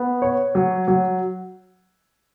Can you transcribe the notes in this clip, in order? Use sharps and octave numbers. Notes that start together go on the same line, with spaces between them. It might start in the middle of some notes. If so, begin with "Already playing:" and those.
Already playing: B3
C#5
F#3
F#3